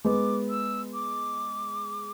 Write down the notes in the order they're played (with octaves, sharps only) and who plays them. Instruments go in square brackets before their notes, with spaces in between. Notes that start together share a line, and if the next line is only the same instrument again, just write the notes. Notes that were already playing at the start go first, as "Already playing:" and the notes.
[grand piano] G#3 B3 [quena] D6
[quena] E6
D6